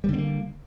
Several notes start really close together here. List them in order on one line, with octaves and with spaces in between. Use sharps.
G3 D3 C4 A#3